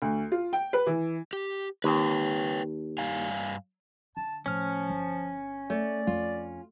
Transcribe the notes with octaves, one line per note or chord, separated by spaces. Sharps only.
D2
F4
G5
B4
E3
G4
D#2 B4 C#5 G5
G2 F5 G#5
D3 A5
A2 F3 C#4 F6
G1 D4
A3 D5
F2 F4